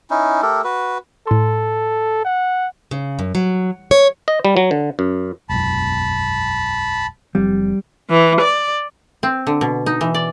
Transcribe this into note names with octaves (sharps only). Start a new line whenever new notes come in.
C#4 D#4 E4
A3 G4 A4 A#4
F#4 B4
A2 A4 C6
F#5
C#3
F#2
F#3
C#5
D#5
G3
F#3
D3
F#2
E1 B1 F#2 A5 B5
F#1 F3 G3 C4
E3
D5
C4
D3
B2
D#4
E3
D5